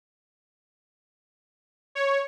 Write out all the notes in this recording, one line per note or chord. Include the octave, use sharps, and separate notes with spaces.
C#5